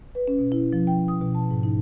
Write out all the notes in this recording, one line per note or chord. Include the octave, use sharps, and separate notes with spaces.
B4
C#4
B2
E4
F3
G5
D#6
B2
A5
G#2
D#4